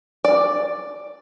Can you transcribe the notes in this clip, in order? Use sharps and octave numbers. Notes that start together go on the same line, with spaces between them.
D5